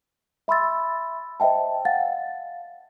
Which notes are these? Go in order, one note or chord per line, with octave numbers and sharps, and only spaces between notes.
E5 B5 C6 E6 A6
C5 D#5 E5 G5 A5
F5 F#5 A6